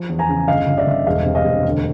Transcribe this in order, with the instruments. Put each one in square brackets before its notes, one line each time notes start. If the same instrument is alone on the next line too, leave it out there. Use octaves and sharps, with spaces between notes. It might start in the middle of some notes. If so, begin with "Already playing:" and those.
Already playing: [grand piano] F3
E2
G#5 A#5
C#3
G1 D#5 F5
G1
D5 E5
G1
E1 D#5 F5
C3
D#5 F5
E1
D2